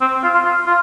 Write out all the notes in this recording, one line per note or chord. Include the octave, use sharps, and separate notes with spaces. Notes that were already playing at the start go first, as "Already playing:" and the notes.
C4
F4
F4
F4
F4